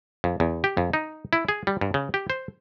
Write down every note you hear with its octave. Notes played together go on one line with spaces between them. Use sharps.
F2
E2
G4
F2
D#4
E4
G#4
G3
G2
C#3
G4
C5